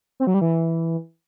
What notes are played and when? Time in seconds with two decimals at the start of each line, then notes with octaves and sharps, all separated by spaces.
0.20 C4
0.27 F#3
0.34 G3
0.41 E3